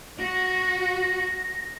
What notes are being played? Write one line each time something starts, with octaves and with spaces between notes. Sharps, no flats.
F#4 A#6